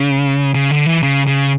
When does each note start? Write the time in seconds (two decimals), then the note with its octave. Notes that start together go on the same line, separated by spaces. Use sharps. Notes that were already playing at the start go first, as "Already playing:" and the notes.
Already playing: C#3
0.54 C#3
0.71 D3
0.86 E3
1.03 C#3
1.26 C#3